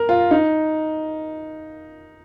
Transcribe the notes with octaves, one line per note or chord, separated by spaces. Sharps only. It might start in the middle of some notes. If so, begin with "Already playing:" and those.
Already playing: A#4
F4
D#4